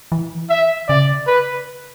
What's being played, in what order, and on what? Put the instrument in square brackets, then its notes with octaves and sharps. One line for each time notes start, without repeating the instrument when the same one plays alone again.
[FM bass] E3
[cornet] E5
[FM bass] C#3 [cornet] D5
[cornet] B4